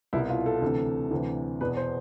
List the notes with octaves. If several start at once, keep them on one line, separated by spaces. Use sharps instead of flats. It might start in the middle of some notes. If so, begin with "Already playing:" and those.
C2 B2 E4
F4
A4
D2 C3 E3
D2 C3 E3
E2 B2 B4
C5